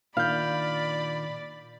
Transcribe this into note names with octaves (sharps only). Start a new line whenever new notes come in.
A#2 D#3 D4 D5 F5 B5 G6